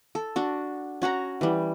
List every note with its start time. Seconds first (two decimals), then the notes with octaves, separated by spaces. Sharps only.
0.15 A4
0.36 D4 F#4
1.02 C#4 F#4 F#5 A#5
1.41 E3 G3